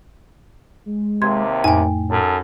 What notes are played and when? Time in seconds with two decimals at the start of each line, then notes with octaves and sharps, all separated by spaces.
0.86 G#3
1.22 D#2 C3 C6 G#6
1.64 F2 A2 G5 G#5
2.10 F#2 A4